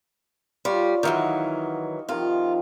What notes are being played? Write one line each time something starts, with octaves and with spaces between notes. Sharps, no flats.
G3 F4 C#5
D#3 E3 F#3 D#5 F5 F#5
C3 D#3 F3 F4